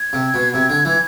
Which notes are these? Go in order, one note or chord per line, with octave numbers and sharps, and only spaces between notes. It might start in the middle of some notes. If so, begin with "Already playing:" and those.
Already playing: G#6
C3
B2
C3
D3
E3